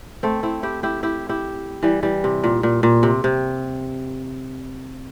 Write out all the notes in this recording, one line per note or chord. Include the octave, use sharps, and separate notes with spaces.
A3 C4
C4 E4
E4 G4
E4 G4
E4 G4
E4 G4
E3 G3
E3 G3
C3
A#2
A#2
A#2
C3
C3